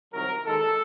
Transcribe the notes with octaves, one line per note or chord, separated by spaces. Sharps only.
C2 C3 D#3 F#3 A#4
D#2 D#3 G#3 A4